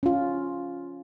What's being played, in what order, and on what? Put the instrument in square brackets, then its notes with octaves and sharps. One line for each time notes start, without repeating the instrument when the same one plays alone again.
[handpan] C#4 F4